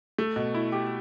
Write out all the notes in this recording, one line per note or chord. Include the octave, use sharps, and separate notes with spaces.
A3
B2
E4
G4